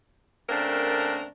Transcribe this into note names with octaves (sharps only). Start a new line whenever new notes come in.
C#3 A3 A#3 C4 D4 A#4